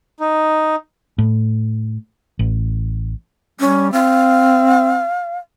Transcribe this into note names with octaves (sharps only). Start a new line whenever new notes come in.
D#4
A2
A1
G3 C#4
C4 F5